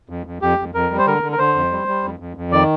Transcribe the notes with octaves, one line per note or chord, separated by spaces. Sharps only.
F2
F2
F2 G4
F2
F2 A#4
G3
C5
D3 A#4
D3
A#4
D3 C5
F2
G3
G3
F2
F2
F2
D#3 D5